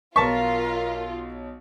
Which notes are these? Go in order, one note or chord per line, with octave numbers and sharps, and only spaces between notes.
B1 F4 A#4 C#5 A5 C#6 B6